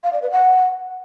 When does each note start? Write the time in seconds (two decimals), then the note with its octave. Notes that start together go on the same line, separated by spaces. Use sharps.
0.04 F5
0.13 D5
0.22 B4
0.31 F#5